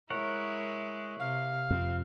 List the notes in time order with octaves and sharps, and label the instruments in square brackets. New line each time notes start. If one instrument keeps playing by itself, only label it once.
[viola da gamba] G#3 E4 [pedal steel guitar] A#4 C#5 F#5
[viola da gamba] C3 [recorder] F5
[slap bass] F2 [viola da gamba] C4